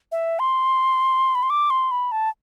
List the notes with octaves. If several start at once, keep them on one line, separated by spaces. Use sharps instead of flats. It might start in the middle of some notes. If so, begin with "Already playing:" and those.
E5
C6
B5
C6
D6
C6
B5
A5